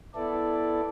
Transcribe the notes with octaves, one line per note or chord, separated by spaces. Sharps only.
B3 E4 A4 D5